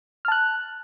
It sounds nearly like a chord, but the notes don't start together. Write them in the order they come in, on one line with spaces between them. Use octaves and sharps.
F6 A5 F#6